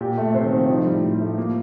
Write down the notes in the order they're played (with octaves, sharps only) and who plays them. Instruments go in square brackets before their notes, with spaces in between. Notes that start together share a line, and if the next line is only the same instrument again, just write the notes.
[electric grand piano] A#2 [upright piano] G4
[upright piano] A3
[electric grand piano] C3 [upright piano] C5
[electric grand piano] D#3
[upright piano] C4
[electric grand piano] F3
[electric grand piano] F3 [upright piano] D#4
[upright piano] A2 [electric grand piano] G3
[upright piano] A2
A3
[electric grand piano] A#3 [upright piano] F4